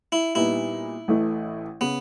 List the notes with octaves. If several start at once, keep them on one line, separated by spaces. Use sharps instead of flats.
E4
A#2 G3 B3 D#4 E4
A1 A2 E3 A3
C#3 B3